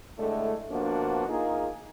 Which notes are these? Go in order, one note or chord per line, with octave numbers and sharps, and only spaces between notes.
A2 D3 G#3 A3
B2 F3 A#3 D4 F#4
A#3 D#4 F4 G#4